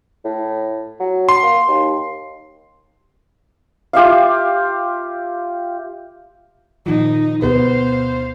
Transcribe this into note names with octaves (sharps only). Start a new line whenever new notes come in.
A2
F#3
C6
A#3
D#2
F4 G4 E5 F5
A#2 D#3 F3 D#4
D2 B2 B3 C5 F5